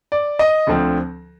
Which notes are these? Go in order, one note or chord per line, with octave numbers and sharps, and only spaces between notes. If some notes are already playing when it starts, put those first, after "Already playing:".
D5
D#5
D2 D3 F3 C4